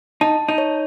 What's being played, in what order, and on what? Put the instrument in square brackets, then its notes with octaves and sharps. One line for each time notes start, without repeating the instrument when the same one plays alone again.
[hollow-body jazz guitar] D#4 [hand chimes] A5
[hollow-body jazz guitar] D#4
[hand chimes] C#5